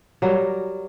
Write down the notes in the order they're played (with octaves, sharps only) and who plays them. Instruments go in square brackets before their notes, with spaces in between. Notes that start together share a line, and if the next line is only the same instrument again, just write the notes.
[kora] F#3 G3 A#4